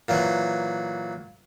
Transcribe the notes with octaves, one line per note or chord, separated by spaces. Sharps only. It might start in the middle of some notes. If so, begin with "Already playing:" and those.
A#2 E3 F#3